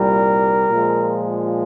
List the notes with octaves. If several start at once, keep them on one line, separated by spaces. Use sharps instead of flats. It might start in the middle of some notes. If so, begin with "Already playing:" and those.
Already playing: C2 A#2 G3 A#4
A#2 F3 G#3